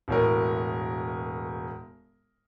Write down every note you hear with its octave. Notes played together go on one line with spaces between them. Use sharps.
E1 A2 A#4